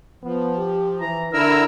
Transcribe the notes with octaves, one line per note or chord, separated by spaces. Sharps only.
F3 B3
G4
E3 A#5
D3 D4 E4 A#4 E6